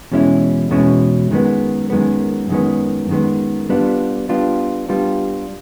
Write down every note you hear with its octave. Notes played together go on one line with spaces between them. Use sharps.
E2 B2 G#3 C#4 E4
E2 B2 G#3 C#4 E4
F#2 D#3 G#3 B3
F#2 D#3 G#3 B3
F#2 D#3 G#3 B3
F#2 D#3 G#3 B3
G3 B3 D4 F4
G3 B3 D4 F4
G3 B3 D4 F4